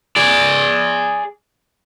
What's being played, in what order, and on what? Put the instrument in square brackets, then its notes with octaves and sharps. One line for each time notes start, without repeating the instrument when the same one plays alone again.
[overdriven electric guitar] G#4 D5